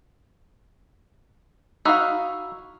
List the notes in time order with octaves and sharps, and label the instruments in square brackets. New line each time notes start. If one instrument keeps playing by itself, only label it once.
[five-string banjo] D#4 F5 [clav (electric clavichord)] E4 F#4 E5